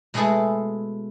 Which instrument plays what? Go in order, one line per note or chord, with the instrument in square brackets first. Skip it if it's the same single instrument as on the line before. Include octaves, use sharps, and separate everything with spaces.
[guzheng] B2 G#3 A3 E4 G#4 A4